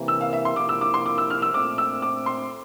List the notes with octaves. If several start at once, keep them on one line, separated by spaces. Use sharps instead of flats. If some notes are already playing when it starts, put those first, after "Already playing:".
Already playing: C3 E3 A#3
E6
F5
E5
C6
C3 F3 A#3 E4 D6
E6
D6
C6
D6
E6
F6
E6
A#2 A3 C4 D6
E6
D6
C6